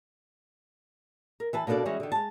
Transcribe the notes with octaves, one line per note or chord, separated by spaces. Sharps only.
A#4
E3 B4 A5
B2 A#3 B3 D4 A4 D5
E3 G3 G#3 C#4 F#4
D3 D#3
G#3 A5